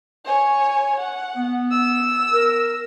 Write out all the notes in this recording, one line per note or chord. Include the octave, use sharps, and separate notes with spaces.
C#5 G#5
F#5
B3
E6
A#4